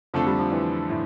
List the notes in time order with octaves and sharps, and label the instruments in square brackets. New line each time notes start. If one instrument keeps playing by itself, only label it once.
[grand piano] F2 D3 A3 D4 A4 [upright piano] F3
[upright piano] G3
F3
E3
A2